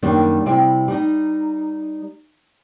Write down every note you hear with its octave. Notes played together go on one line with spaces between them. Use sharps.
F#2 D#3 G3 A#3 D4
C3 G3 E4 G4 G5
G3 D#4